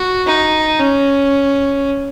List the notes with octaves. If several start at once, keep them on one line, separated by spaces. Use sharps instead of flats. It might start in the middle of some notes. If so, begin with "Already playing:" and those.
Already playing: F#4
D#4
C#4